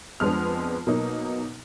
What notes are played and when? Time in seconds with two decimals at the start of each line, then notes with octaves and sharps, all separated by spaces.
0.20 F2 F3 G#3 B3 D4 F6
0.87 B2 F#3 A#3 D#4